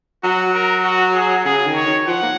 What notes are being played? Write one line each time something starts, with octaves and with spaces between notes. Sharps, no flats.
F#3 F#4
A#4
F#4
G#4
C#3 G#4
D#3
C#5
D#3
F3 F#5
A#3